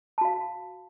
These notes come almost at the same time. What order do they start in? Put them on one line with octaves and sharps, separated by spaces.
A5 F#4 F5